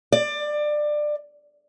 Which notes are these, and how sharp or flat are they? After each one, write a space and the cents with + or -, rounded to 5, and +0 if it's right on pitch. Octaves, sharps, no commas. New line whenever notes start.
D5 +20